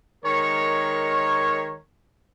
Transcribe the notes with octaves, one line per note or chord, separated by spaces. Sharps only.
D#3 G#3 A#4 C#5